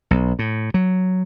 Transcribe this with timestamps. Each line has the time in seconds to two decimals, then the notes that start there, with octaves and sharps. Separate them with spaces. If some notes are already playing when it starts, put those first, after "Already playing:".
0.11 B1
0.39 A2
0.74 F#3